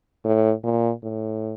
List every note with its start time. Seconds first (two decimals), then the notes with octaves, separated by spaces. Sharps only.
0.25 A2
0.64 A#2
1.03 A2